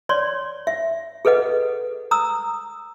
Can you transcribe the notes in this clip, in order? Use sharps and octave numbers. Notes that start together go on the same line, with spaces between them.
C#5 D5 C6
E5
G#4 A4 B4 D#5 F#5
A#5 D#6 E6